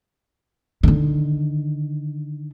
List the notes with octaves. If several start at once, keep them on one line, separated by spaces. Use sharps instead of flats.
D3 D#3